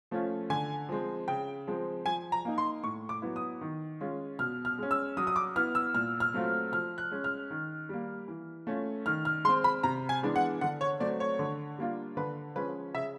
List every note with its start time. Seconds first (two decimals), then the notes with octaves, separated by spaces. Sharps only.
0.11 F3 A3 C#4 F4
0.50 D3 G#5
0.89 F3 G#3 C4
1.28 C#3 G5
1.67 F3 G#3 C4
2.06 F3 G#5
2.32 A#5
2.45 A#3 D#4
2.58 C6
2.84 A2 C#6
3.09 D6
3.22 F#3 B3 E4
3.36 D#6
3.61 D#3
4.00 G#3 C#4 F4
4.39 B2 F6
4.65 F6
4.78 G#3 C#4
4.91 E6
5.17 F#3 D#6
5.27 D#6
5.36 D6
5.56 B3 E4 F6
5.75 E6
5.95 A#2 F6
6.20 F6
6.34 F#3 A3 C4 F4
6.72 F3 F6
6.98 F#6
7.11 G#3 C#4
7.24 F6
7.50 D#3
7.89 G3 A#3
8.28 E3
8.67 A3 C#4 F4
9.06 D#3 F6
9.25 F6
9.45 G#3 C6
9.49 C4
9.64 B5
9.83 C3 A#5
10.09 G#5
10.23 E3 G#3 B3 D4
10.36 F#5
10.61 D3 F#5
10.81 C#5
11.00 F#3 A3 C4 D5
11.20 C#5
11.39 D3
11.78 G3 A#3 D4 F4
12.17 D3 B4
12.56 F3 G#3 C#4 B4
12.94 C#3 E5